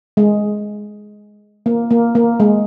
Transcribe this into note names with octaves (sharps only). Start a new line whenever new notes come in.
G#3
A#3
A#3
A#3
G#3